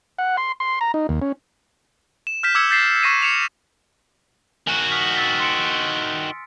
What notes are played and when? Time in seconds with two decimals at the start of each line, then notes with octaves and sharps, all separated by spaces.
0.18 F#5
0.37 C6
0.60 C6
0.81 A#5
0.94 D#4
1.09 D#2
1.22 C#4
2.27 E7
2.43 F6 G6 B6 E7
2.55 D6 E6 G#6 C#7 E7
2.71 G6 A6 B6 C7 E7
3.03 C#6 E6 A#6 C7 D#7 E7
3.22 C#7 E7 F7
4.67 D#3 F#4 G#5
4.91 D#6 F6 B6
5.15 E6 A6 B6
5.40 C6 C#7 D7